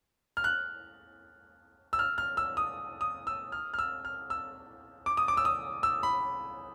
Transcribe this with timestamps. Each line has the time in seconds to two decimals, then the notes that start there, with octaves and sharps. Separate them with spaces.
0.37 F6
0.44 F#6
1.93 E6
1.99 F6
2.18 F6
2.37 E6
2.57 D#6
3.01 D#6
3.27 E6
3.52 F6
3.74 F6
3.79 E6
4.05 F6
4.30 E6
5.06 D6
5.17 D#6
5.28 D6
5.37 E6
5.45 D#6
5.83 E6
6.03 B5